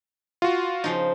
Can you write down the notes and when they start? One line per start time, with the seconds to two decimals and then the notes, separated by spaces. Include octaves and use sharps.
0.42 F4 F#4
0.84 C#3 F3 D#4